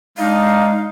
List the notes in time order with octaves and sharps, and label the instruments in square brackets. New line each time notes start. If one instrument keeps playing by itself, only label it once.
[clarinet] G#3 [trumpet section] D4 D#4 [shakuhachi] F5